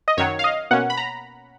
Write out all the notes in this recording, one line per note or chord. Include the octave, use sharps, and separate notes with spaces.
D#5
F#2 D#3 F#3 C#5
F5
D#5
B2 A#3 C#4 F#5
B5
A#5